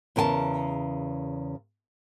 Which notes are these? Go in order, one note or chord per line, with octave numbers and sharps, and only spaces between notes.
E2 C#3 A#4 G#5 A5